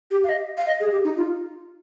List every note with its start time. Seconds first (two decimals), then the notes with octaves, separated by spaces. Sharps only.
0.11 G4
0.24 F5
0.29 D#5
0.57 F5
0.67 D#5
0.80 G#4
0.92 G4
1.04 D#4
1.17 F4